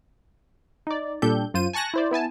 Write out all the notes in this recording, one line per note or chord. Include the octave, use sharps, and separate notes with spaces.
D#4 D5
A#2 G3 D4 G4 A4 G6
F#2 F4 C5 D#7
G#5 A5 C#6 F#6 A#6
E4 C5 D5
B3 E4 G#5 A5